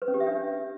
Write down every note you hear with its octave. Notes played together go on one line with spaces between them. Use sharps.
B4
C#4
G4
E5
D4